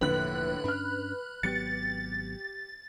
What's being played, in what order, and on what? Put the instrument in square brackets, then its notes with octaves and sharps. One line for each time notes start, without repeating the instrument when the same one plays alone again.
[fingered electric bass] E1 F3 A#3 [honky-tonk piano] A2 D3 [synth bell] B4 F#6
[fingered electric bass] G2 C#4 D4 [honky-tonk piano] B5 F6
[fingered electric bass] G#1 F#3 B3 [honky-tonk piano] G4 C#7 [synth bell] A6